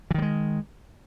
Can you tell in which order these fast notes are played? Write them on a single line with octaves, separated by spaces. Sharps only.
E3 D#3 G3 G#3